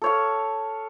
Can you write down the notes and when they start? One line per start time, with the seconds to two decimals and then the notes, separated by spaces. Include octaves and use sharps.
0.02 A4 C#5 F5